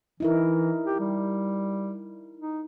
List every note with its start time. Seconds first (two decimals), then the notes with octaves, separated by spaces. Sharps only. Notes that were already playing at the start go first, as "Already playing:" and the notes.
0.20 E3 D#4 E4 A#4
0.86 G4
1.00 G3
2.37 D#4